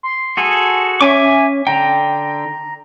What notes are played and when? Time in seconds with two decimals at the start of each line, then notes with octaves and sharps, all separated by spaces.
0.03 C6
0.37 F#4 G#4 A4
1.01 C#4 E5 G#5 D6
1.67 D3 G5 A#5